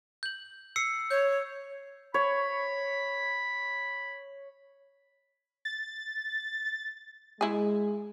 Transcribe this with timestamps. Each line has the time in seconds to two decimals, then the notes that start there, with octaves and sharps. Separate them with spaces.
0.23 G6 F#7
0.76 E6 C7 C#7
1.11 C#5 G6
2.14 C#5 B5
5.65 A6
7.41 G#3 E4 G#4